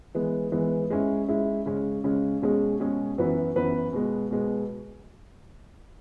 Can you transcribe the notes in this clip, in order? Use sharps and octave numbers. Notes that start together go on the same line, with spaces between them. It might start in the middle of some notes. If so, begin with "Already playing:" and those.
E3 G#3 B3
E3 G#3 B3
G#3 C#4 E4
G#3 C#4 E4
C#3 G#3 C#4
C#3 G#3 C#4
B2 G#3 C#4 G#4
B2 G#3 C#4 G#4
F#2 E3 B3 F#4 B4
F#2 E3 B3 F#4 B4
B2 G#3 B3
B2 G#3 B3